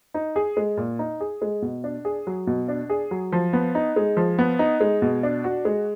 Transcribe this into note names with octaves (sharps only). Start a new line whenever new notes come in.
D#4
G#4
G#3
A#2
D#4
G#4
G#3
B2
D4
G#4
F#3
B2
D4
G#4
F#3
F3
B3
D#4
G#3
F3
B3
D#4
G#3
B2
D4
F#4
G#3